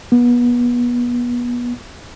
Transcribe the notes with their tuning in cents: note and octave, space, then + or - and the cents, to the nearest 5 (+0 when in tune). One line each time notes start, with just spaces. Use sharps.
B3 -30